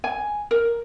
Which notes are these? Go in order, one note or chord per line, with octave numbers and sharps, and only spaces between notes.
G#5
A#4